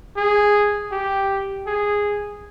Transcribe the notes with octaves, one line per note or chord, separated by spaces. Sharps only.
G#4
G4
G#4